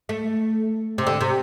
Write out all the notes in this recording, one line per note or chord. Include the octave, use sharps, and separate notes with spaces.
A3
C3
D3
C3